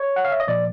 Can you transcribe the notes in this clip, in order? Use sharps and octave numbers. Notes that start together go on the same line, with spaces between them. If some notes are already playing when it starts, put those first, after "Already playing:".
Already playing: C#5
F#5
F5
E5
D#5
A#2 F3 D5